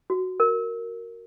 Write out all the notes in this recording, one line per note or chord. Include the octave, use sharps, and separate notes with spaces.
F#4
A#4